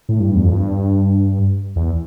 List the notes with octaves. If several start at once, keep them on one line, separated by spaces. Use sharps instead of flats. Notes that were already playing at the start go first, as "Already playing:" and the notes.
A2
G2
E2
F2
G2
E2